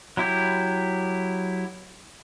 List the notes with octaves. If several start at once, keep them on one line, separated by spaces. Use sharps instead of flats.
F#3 E4 G4